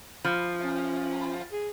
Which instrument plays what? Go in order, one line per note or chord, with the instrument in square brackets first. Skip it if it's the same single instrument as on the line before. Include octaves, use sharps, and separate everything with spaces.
[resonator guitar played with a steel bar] F3
[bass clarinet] C#4
G#4